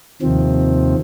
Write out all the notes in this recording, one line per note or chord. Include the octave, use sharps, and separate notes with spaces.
D#2 C3 D#3 F3 C4